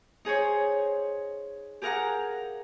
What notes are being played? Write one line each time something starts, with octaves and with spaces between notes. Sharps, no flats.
D#4 G#4 C5 C#5
G4 G#4 A#4 F5 F#5 A#5